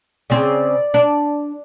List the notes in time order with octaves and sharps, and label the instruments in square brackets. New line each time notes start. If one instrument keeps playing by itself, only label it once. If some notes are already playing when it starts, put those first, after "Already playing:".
[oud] C#3 C4 [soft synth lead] D5
[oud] D4